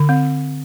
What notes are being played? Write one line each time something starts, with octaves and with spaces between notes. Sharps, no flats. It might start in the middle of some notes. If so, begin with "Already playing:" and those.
Already playing: D3
C4